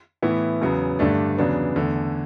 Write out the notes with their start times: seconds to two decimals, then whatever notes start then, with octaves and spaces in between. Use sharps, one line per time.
0.22 A2 E3 B3 E4
0.61 E2 C#3 F#3 B3
0.99 G2 D3 A3 D4
1.38 E2 C#3 F#3 B3 D4
1.76 E2 D3 A3